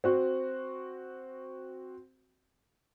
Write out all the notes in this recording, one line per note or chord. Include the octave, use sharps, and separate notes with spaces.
C4 F#4